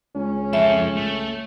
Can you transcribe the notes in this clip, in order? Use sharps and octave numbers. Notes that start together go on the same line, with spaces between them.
C#2 C#4
F2 A4 E5
A3